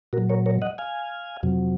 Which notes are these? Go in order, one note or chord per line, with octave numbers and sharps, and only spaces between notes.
A#2 F#4 A#4
F#3
A#4 C#5
A#4 C#5
D#5 F#5
F5 G#5
F2 C3 F#3